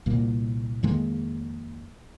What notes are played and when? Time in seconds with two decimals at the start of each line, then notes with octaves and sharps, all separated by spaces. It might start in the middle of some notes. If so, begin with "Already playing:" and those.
0.06 C2 A#2 G3 A#3
0.83 F2 D#3 G#3 A#3